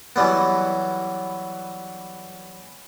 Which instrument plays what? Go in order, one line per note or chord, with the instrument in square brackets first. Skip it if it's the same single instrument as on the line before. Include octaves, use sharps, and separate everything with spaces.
[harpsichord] E3 F#3 G3 B3